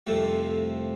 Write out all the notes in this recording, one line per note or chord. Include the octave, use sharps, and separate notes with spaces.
C2 F2 C3 A3